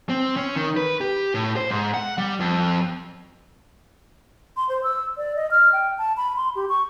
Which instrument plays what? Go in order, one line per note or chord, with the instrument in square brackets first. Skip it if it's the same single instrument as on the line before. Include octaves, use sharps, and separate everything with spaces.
[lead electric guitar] C4
C#4
D#3
B4
G4
A2
C5
G#2
F#5
G3
F2
[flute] C6
C5
E6
D5
D#5
F6
G5
A5
B5
C6
G4
C#6